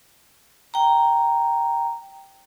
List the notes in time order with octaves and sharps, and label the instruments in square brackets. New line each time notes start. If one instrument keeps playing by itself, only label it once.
[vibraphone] G5 A#5